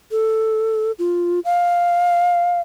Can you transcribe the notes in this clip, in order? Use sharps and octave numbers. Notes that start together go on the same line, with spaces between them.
A4
F4
F5